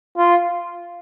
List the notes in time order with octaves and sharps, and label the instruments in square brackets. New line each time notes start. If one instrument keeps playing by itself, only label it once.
[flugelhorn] F4